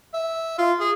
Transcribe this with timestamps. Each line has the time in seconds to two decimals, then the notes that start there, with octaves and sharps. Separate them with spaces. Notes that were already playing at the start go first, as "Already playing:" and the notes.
0.14 E5
0.58 F4
0.80 G#4